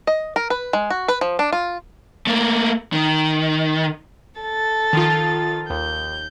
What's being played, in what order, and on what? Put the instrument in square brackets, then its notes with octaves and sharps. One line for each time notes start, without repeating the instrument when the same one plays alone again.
[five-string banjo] D#5
A#4
B4
G#3
F#4
B4
F3
D4
F4
[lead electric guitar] A3 A#3
D#3
[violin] A4 A6
[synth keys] D#3 F3 F4
[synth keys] D#2 [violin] G6